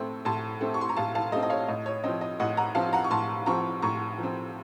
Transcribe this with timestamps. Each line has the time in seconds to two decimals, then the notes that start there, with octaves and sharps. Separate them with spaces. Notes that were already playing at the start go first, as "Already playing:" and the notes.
Already playing: A2 A3 C4
0.25 A2 A5 C6
0.61 A3 C4
0.74 C#6
0.81 C6
0.89 A#5
0.97 A2 F5 A5
1.15 F5 A5
1.32 A3 D#5
1.36 C4
1.43 D#5
1.50 C#5 F5
1.68 A2 D#5
1.86 C#5
2.04 F3 C4 D#5
2.21 D#5
2.40 A2 D#5 F#5
2.57 F#5 A#5
2.75 F3 C4 F5 A5
2.93 F#5 A#5
3.04 C#6
3.10 A2 A5 C6
3.46 F3 C4 A#5 C#6
3.82 A2 A#5 C#6
4.18 F3 C4